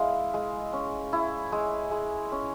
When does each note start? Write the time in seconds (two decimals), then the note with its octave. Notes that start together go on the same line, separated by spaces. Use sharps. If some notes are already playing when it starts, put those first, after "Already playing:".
Already playing: G#3 E4 F5
0.34 G#3
0.73 C#4
1.13 E4
1.52 G#3
1.91 G#3
2.32 C#4